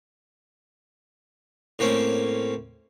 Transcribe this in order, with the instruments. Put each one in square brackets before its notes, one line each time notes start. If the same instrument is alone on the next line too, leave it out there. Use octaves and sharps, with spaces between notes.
[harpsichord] A2 A#3 C4 C#4